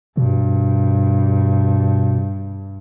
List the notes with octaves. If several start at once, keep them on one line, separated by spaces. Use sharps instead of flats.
G2 B2